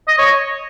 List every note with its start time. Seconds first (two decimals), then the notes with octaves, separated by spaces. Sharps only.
0.08 D#5
0.19 C#5